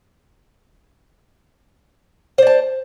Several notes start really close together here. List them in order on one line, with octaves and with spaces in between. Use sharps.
C5 D5 A5